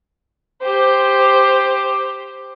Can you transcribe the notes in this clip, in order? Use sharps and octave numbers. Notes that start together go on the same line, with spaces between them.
G4 C5